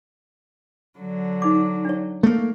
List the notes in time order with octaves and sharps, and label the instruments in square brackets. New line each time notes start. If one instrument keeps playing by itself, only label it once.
[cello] D3 F#3
[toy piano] D#4 D6
D4 C#5
[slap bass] A3 A#3